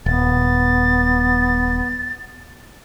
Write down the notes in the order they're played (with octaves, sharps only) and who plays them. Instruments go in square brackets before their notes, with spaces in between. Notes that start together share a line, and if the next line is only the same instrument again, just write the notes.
[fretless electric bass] D#1 [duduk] B3 [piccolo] A6